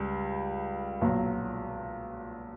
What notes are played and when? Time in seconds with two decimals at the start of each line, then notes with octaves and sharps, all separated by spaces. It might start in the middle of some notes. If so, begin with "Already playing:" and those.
Already playing: C#2 G3
1.01 B1 A#2 F#3